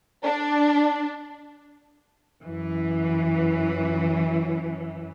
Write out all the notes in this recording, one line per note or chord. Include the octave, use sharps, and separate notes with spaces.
D4
F#2 E3